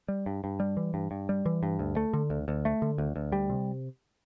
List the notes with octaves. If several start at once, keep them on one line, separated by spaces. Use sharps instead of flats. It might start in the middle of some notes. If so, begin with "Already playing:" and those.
G3
G2
G2
G3
E3
G2
G2
G3
E3
G2
D2
A3
D3
D2
D2
A3
D3
D2
D2
G3
C3